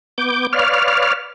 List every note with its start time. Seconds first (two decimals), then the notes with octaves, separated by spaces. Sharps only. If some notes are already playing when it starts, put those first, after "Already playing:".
0.18 B3 D6 G6
0.53 B4 C#5 D5 F5 F6